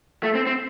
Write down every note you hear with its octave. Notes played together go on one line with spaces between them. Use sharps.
A3
C4
C4